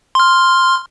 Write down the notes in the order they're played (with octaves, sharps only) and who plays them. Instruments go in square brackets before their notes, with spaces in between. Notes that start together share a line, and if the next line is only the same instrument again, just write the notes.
[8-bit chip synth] C6 F6